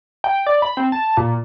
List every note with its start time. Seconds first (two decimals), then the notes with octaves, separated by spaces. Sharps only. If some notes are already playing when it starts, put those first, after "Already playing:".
0.24 G5
0.46 D5
0.62 B5
0.77 C4
0.92 A5
1.17 A#2